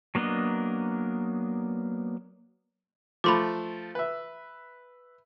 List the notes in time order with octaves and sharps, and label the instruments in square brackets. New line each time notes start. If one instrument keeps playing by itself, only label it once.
[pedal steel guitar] F#3 A#3 B3 D4 D#5
[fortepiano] F3 A3 [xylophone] B5 C6 D6
[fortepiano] B4 E5